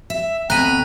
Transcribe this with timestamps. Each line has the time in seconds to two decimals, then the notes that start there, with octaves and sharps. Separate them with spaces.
0.10 E5
0.50 D2 B2 C4 A#5 B5 F#6 D#7